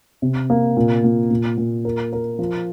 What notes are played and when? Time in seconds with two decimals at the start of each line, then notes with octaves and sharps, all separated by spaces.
0.22 C3
0.50 A#3
0.77 A#2
1.04 A#2
1.31 A#2
1.58 A#2
1.85 A#4
2.13 A#4
2.39 F3